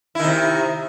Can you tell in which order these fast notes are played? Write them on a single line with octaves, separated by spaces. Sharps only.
E4 D#3 C3